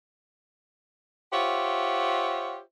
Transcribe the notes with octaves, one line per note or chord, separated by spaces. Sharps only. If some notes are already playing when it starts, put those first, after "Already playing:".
F4 G4 C5 C#5 E5 F#5